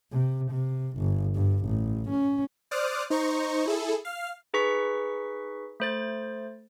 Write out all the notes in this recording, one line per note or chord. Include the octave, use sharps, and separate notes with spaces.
C3
C3
G1
G2
A1
C#4
C5 D5 D6 D#6 F6 F#6
D#4 C5 A#5 C#6
E4 G#4 A4
F5 F6
D#4 G#4 B4 C#6 B6
A3 C5 A6